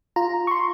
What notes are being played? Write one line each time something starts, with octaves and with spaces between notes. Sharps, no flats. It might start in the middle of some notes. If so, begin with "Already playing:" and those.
F4 A#5
C#6
C6